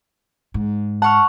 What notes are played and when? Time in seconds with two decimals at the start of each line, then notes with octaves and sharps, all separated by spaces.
0.54 G#2
1.02 F#5 A5 C#6 F6